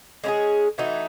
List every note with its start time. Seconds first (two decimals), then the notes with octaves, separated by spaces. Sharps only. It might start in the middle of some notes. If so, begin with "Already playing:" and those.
0.24 G#3 C#4 E4 G#4
0.78 E3 A3 D#4 F#4